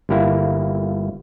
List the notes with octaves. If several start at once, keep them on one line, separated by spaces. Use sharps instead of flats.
G1 A#3 E4